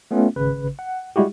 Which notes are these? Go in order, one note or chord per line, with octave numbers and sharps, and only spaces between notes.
A3 B3 C#4 F4
G#1 C#3 B4
F#5
G3 G#3 E4 F#4 G4